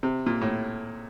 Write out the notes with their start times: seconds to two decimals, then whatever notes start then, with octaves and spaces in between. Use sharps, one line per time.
0.03 C3
0.26 A#2
0.41 A2